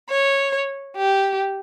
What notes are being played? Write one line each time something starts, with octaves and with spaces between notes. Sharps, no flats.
C#5
G4